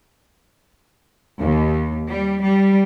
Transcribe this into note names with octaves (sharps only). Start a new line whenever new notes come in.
D#2
G3
G3